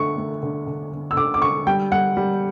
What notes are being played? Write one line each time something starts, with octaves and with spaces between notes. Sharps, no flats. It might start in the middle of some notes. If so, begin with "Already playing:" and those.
Already playing: D3 A3 C#6
A3
D3
D3
D3
E6
D3 D6
D6
D3 C#6
G3 G5
G3 F#5
G3